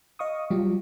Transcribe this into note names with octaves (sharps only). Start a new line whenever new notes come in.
D#5 F5 C#6 D#6
F#3 G3 F4 G4